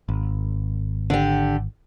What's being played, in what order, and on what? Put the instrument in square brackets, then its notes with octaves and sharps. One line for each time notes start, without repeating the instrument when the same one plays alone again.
[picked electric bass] G#1
[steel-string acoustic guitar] D3 G4